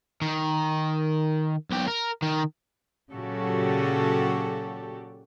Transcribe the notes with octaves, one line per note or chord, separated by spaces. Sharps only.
D#3
B1 G4
A#4
D#3
A#2 C#3 F#3 F#4 G4 A4